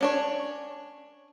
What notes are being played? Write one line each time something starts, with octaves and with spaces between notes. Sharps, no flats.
C#4 D4 C#5